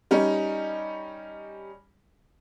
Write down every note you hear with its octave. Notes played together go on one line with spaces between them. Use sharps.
G3 C#4 D#4